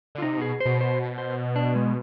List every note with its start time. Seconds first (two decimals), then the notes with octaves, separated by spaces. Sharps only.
0.15 D3 F4
0.22 C3 D#4
0.38 B2 G#4
0.60 C5
0.65 B2
0.81 C5
1.18 C5
1.56 D4
1.75 G#3